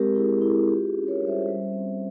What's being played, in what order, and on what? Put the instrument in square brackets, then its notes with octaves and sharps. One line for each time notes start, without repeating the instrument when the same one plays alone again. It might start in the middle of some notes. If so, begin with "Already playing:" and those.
Already playing: [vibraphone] G#3 C4 G4 A#4
E4 G#4
E4 G#4
F4 G4
G#4
C#4
A#4 C#5
G3
C5 E5
G3
C4